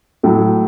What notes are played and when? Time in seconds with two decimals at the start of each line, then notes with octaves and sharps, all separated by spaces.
0.23 A2 F#3 A4